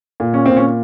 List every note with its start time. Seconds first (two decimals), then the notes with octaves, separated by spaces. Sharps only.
0.20 A#2
0.34 C#4
0.46 A#2 C4
0.57 C#4